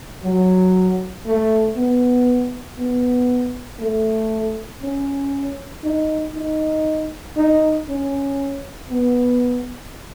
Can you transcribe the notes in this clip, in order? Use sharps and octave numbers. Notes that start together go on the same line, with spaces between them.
F#3
A3
B3
B3
A3
C#4
D#4
D#4
D#4
C#4
B3